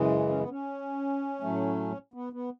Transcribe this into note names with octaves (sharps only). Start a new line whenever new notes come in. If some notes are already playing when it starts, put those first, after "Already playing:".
Already playing: F#2 C#3 E3 G#3
C#4
B3
C#4
A2 F#3 A3
B3
B3